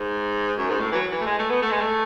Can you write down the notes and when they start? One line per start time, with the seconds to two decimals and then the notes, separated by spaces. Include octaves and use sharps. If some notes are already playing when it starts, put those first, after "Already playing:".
Already playing: G#2
0.58 F#2
0.69 G#2
0.80 A2
0.92 E3
0.95 F#3
1.11 E3
1.21 A3
1.26 G#3
1.39 A3
1.50 B3
1.62 A3
1.71 G#3
1.81 A3